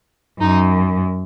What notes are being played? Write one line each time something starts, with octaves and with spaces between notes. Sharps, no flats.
F#2 D#4